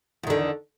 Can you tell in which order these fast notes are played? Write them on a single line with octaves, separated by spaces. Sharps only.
E2 D#3 D3